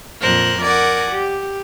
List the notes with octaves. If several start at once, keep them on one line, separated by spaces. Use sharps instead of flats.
F2 A#2 A#4 C5 F#6
A#4 D5 F#5 G#5
G4